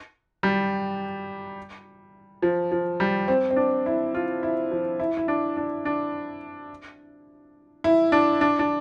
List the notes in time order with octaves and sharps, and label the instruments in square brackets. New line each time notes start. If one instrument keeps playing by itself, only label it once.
[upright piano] G3
F3
F3
G3
C4
C4
D4
E4
F4
E4
F3
E4
E4
D4
D4
D4
E4
D4
D4
D4